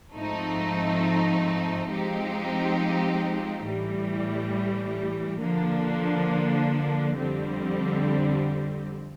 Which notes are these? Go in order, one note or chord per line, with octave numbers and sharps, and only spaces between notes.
G#2 F3 A3 C4 D#4
F3 G#3 C4 D#4 G4
A2 E3 G3
D3 F3 A#3 D4
F2 D3 G3 C4